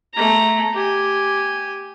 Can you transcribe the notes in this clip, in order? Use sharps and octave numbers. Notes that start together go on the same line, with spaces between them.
A3 A#5
G4 G#5